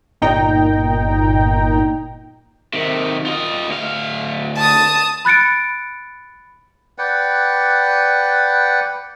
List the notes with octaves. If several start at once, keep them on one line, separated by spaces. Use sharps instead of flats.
G1 A#2 D#4 G5 A#5
C3 D#3
F4 D#5
D2 F5
A5 D#6
B5 F#6 A6 C#7 D7
B4 D5 F#5 G5